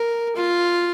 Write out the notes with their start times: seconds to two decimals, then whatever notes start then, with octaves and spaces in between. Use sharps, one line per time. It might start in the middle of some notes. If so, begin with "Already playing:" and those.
Already playing: A#4
0.36 F4